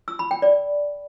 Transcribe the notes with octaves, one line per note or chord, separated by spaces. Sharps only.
E6
B5
G5
D5